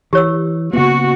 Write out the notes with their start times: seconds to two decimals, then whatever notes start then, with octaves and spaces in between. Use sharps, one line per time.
0.13 E3 G4 C#5 E6
0.73 C#3 A#3 B3 F#4